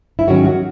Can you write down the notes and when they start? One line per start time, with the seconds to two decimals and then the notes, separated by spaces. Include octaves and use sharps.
0.19 E4
0.27 G#2 D#3 F#3 C#4 F#4
0.45 F#4